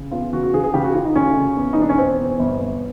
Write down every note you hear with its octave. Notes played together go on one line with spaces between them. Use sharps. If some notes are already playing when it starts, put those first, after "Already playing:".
Already playing: C#3
E2 F4
C#3 F#4
F#4
C#3 G#4
G#4
C#3 G4
F#4
C#3 F4
D#4
D2 C#4
C#3
E2
D#4
E1 D4
C#4
E1 C4
E2
G1
G1